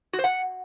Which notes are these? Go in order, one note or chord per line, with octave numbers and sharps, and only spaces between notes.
F#4
C5
F#5